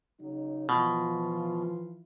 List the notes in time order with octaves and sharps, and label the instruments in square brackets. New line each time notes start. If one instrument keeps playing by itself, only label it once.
[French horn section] C#3 F#3 D#4
[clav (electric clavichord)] B2 [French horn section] E3 F3 F4